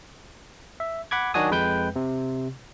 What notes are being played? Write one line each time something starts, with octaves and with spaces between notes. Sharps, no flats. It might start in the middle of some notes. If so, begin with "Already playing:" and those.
E5
F#5 B5 D6 G#6
D#3 F#3 D4 F#4 G#5 D#6
F2 G#3 B4 G5 G6
C3